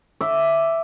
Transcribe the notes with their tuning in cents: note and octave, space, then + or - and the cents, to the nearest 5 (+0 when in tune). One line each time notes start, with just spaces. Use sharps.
E5 +5 D6 +0